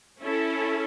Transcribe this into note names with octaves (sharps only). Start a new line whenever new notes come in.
C#4 E4 A4